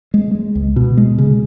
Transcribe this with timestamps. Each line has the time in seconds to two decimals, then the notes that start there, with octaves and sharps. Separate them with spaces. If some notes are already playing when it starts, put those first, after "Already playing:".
0.14 G#3
0.35 G#3
0.55 C#2
0.76 B2
0.97 G#3
1.18 C#3